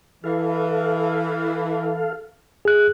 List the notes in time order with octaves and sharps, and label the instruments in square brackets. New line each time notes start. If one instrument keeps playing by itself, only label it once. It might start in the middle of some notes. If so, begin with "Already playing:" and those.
[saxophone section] E3 [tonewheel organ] A4 F5
[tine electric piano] G#4 F#6